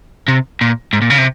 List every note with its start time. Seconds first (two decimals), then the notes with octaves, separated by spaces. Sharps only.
0.28 C3
0.61 A#2
0.93 G#2
1.02 A#2
1.10 C#3
1.18 C3